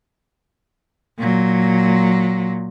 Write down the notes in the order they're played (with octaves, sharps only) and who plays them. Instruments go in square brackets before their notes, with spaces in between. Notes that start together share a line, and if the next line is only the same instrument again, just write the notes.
[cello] A#2 F#3